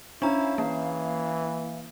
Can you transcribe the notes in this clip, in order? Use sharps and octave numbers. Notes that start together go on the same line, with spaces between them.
C#4 D4 E4 F5 A#5
E3 A#3